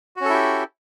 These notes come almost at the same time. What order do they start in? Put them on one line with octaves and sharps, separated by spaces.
F#4 C#4 A4 E4 G4